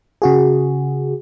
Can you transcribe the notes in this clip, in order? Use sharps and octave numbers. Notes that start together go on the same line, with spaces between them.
C#3 F#4 G#4